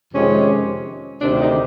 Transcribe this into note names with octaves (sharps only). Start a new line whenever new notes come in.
F2 C3 D#3 G#3 C#4
D2 C3 D#3 D4
D#4